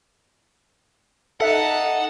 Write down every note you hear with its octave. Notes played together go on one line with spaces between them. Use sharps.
D#4 A4 E5 F#5 A5 F#6